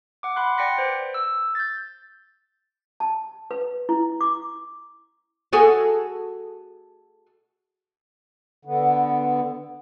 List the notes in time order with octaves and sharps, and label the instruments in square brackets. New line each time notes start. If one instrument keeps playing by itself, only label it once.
[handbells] F#5 D6
F#5 B5 C6 F#6
D5 G5 C6 A#6 B6 C#7
B4 C5
E6
G6 A6
[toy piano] A5
B4
E4
D6
[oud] F#4 G#4 A4
[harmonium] D3 B3